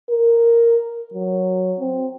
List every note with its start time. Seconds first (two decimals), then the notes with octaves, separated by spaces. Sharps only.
0.10 A#4
1.14 F#3
1.80 C4